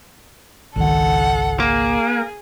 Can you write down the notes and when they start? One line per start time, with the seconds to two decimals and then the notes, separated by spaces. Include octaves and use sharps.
0.76 G#1 C#2 D#3 A4 F#5
1.60 A#3 G#4